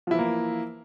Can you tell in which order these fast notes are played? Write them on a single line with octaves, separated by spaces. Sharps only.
F3 E4 E3 A#3